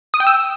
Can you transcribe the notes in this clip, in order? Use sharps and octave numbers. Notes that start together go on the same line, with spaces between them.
D#6
G5
E6